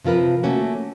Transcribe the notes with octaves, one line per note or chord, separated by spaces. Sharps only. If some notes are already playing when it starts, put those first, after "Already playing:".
C3 F3 F4 A#4 B4
A3 A#3 C#4 F#4